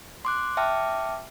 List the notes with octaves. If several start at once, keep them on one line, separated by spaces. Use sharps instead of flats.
C6 D6 F#6
E5 G5 A5 D6 F6